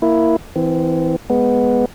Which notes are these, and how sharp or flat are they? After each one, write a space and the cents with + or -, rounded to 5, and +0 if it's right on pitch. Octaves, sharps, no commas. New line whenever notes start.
A#3 -5 E4 +0
E3 -10 C4 -30
G#3 +0 B3 +0